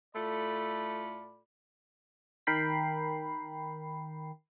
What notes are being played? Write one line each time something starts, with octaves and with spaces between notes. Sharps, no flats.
A2 A3 F4 A4 D5 B5
D#3 A#4 G5 B5 C7